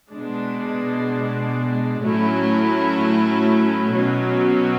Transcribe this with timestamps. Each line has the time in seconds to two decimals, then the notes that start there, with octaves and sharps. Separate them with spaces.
0.11 B2 G#3 D4
2.01 A2 F#3 A3 C#4 E4
3.91 B2 F#3 C#4